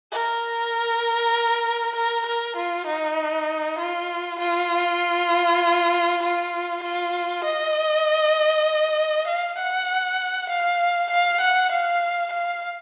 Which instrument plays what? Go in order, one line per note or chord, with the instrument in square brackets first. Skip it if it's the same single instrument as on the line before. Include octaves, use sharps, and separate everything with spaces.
[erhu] A#4
A#4
A#4
F4
D#4
F4
F4
F4
F4
D#5
F5
F#5
F5
F5
F#5
F5
F5